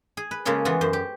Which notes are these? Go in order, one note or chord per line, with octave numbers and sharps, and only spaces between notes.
G#4
B4
C#3 G#3 A#3 C#4 G#4 A4
E3 B3 F4 F#4
F#2 C5
G4